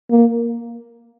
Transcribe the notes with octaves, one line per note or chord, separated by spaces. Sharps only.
A#3